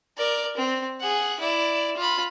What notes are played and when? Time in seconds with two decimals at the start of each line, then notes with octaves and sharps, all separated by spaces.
0.17 A#4 D5
0.57 C4
1.00 G#4 F#5
1.40 E4 D5
1.97 F4 B5